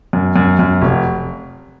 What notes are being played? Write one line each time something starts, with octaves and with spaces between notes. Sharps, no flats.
F#2
F#2
F#2
F1